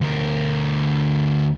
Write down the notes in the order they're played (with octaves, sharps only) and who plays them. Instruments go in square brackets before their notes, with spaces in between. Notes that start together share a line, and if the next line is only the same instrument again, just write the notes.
[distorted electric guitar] D2 A#4